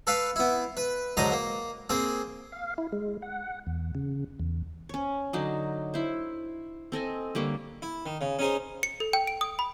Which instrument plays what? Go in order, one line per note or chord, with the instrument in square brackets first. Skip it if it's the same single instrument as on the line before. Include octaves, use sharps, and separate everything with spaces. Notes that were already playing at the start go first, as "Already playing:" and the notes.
[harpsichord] A4 B4 F5
B3 E4
B4
G#2 D3 F#3 C5 A#5 D#6
A#3
A#3 C4 G#4
[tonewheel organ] F5
E4
G#3
F#5
E2
C#3
E2
[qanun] C#4 C#5
D3 F#3 D4 D#4
E4 C5
C4 A4 D#5 G#5
D3 G3 A#3 C#5
[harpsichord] E4
D#3
C#3
C#4 D#4 G#4 C5
[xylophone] C#7
A4
G5
D7
D#6
B5